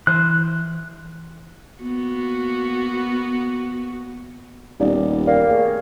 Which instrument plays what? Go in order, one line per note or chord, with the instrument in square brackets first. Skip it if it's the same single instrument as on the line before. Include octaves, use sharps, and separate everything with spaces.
[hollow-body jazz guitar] E3 C5 [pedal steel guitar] F#6
[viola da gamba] A#3 B3 F#4
[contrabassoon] D#1 [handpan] B3 G4 [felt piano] D#4 D5 D#5
[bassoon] A#3 [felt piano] D5 G5
[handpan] A3 G#4 C#5